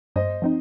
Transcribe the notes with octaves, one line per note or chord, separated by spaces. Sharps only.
G2 C5 D#5
F3 C4 D#4